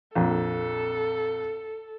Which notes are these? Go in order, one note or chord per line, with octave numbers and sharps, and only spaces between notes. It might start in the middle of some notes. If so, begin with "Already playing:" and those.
A#1 F2 A4